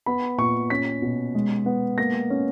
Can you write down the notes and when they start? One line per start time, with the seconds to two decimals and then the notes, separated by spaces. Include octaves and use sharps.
0.06 B3 B5
0.38 A#2 C#6
0.70 C#4 B6
1.02 B2
1.35 G#3
1.66 B3
1.98 A#3 A#6
2.30 C#4